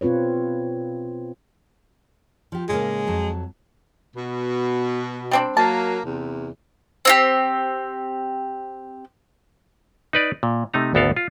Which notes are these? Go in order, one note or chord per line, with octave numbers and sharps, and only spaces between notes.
B2 C4 F4 B4 C#5
F3 G4
A2 C#3 G#3 A#3
F2 F#3 A5
B2
G3 C4 D4
F#3 A#3 A5
E2 C3
C4 F4 G4
D#4 B4 D5
A#2
C3 A3 D#4 A#5
G#1 D2 B3 A4 A#4 F5
F4